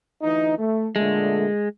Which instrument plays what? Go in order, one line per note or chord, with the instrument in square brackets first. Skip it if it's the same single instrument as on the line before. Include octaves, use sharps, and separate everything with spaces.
[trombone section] D2 E3 D#4
A3
[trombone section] A#2 D3 A3 [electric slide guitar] G#3